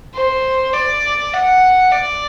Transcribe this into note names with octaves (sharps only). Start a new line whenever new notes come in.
C5
D5
F#5
D5